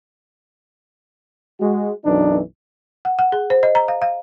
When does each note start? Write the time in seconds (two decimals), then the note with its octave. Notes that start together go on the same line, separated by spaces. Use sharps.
1.60 G#3 F#4
2.05 B1 F#2 E3 D4 D#4
3.05 F#5
3.19 F#5
3.32 G#4
3.50 C5
3.63 D#5
3.75 A#5
3.88 F5
4.02 F5